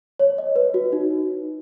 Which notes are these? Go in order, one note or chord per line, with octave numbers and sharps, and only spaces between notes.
C#5
D#5
B4
F#4
D#4